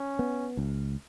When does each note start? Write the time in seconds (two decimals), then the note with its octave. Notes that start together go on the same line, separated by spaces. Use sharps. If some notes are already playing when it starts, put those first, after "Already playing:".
Already playing: C#4
0.19 B3
0.57 C#2